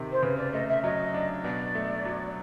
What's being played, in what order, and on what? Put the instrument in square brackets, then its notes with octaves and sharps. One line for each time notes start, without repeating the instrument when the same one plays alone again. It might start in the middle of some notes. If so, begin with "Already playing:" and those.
Already playing: [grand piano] C3 D#3
[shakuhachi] C5
[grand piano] C#3 [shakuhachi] B4
[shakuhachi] D5
[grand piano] A3 [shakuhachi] D#5
[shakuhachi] E5
[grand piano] F#3 [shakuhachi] D#5
[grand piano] D4
[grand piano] B2 [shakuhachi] D5
[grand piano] A3
F#3